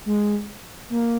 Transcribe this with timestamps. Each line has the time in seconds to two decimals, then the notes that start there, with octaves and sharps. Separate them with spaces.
0.06 G#3
0.90 A#3